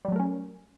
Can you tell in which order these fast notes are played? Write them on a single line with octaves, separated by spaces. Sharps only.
G3 F#3 A3 A#4 C#4